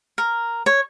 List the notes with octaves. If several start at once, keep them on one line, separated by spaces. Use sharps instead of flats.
A#4
C#5